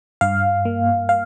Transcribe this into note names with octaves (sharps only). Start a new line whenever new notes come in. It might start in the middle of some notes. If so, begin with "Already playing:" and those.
G2 F5
A#3
F5